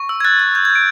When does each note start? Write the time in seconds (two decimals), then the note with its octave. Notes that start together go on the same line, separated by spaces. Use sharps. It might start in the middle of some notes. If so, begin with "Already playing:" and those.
Already playing: C#6
0.09 E6
0.20 G#6
0.25 F#6 A6
0.39 F#6 A6
0.55 G6 G#6
0.65 G6 G#6
0.75 D7